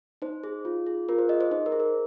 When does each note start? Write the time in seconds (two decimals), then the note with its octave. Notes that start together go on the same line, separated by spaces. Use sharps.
0.22 D#4 C5
0.44 G#4
0.65 F4
0.86 G#4
1.09 F4 A#4
1.18 C5
1.29 G#4 D#5
1.41 C5
1.51 D#4 C5
1.66 A#4
1.72 G#4
1.80 A#4